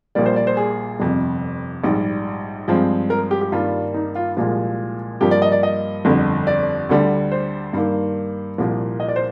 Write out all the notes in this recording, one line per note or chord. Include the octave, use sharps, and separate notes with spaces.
A#1 A#2 G3 A#3 D5
C5
D5
C5
G#4
G1 F2 C3
A#1 G#2 G3
G2 F3 G#3 C4
A#4
G4
G4
G2 D#3 G3 A#3 F4
D#4
F4
C2 A#2 F3 G#3 F4
G2 F3 A#3 G4
D5
D#5
D5
D#5
G1 F2 D3
D5
D2 D3 G3
C5
G2 D#3 A#3
C2 A#2 F3 A#3
D#5
D5
C5